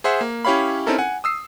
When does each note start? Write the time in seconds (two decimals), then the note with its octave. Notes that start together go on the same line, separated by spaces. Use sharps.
0.04 G#4 C5 E5 F#5
0.21 A#3
0.45 C#4 E4 G4 C#5 F5 B5
0.87 C4 C#4 D#4 E4 A4 A#4
0.98 F#5 G#5
1.24 D#6 E6 C7